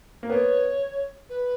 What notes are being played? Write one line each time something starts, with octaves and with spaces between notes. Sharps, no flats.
A#3
B3 C#5
B4